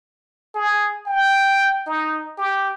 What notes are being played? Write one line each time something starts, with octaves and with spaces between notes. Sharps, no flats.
G#4
G5
D#4
G4